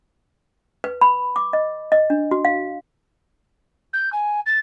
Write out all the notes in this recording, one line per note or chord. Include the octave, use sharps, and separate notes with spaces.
B4
B5
D6
D#5
D#5
D4
F#4
F5
G6
G#5
A6